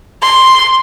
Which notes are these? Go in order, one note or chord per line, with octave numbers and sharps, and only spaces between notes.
C6